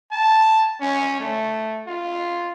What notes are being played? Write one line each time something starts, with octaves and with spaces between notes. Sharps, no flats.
A5
C#4
A3
F4